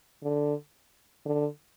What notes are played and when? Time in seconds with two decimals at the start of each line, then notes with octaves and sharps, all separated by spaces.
0.23 D3
1.25 D3